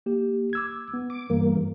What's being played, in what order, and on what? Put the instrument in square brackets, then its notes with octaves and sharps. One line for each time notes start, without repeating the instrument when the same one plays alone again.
[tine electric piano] A#3 G4
D6 E6 G#6
B3
[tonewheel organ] D6
[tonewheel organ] G2 A#3 [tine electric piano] E3